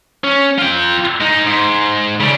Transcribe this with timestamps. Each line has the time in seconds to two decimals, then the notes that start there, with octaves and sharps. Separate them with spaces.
0.24 C#4
0.59 F4 G5
1.21 G#3 D#4
1.45 G#2
2.20 C#3 D4